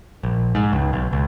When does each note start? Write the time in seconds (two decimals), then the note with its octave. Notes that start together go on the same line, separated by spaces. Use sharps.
0.23 A#1
0.55 G#2
0.73 C#2
0.93 B1
1.13 C#2